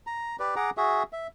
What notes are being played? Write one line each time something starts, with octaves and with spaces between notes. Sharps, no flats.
A#5
G4 B4 D5
G#4 F#5 A#5 D6
F#4 G#4 E5
E5